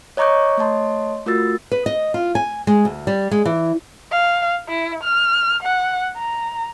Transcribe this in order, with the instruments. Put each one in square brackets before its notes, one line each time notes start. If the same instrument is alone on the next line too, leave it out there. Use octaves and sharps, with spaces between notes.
[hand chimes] C#5 D#5 A#5 C#6 D6 G6
A3 C#5 D#5 A5 C6
A3 F4 F#4 A#4 E6 A6
[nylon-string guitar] B4
D#5
F4
G#5
G#3
D2
G3
G#3
E3
[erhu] F5
E4
F6
F#5
A#5